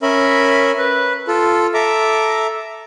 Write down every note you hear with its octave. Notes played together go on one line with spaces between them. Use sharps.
C#4 A#4 E5 B5
B4
F4 A4
A4 E5 A#5 D6